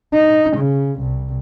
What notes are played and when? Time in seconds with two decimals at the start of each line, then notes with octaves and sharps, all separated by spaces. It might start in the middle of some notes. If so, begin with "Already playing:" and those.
0.13 D#4
0.57 C#3
1.00 C2